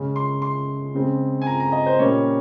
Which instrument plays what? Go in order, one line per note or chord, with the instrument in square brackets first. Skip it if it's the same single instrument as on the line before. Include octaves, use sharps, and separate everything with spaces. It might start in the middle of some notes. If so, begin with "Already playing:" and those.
Already playing: [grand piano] C#3 G#3 C#4
C6
C6
C#3 G#3 C4
G#5
A#5
A#5
D#5
C5
A#2 G3 A#3 C#4 C#5